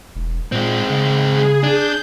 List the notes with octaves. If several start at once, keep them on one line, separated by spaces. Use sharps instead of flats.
E1
A#2 G#3 C4
C#3
G#4
D4 G6